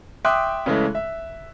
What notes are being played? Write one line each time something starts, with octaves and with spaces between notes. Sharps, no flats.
E5 G5 C6 D6 D#6 F#6
C#3 E3 G#3 A3
E5